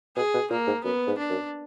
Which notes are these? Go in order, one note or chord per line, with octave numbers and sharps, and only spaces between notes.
B2 G#4
B2
A#2 A#3
G#2
F#2 B3
G#2
D4
F#2